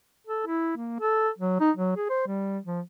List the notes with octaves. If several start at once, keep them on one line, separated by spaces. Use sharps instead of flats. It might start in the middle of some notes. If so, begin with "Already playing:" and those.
A4
E4
A#3
A4
F#3
D#4
F#3
G#4
C5
G3
F3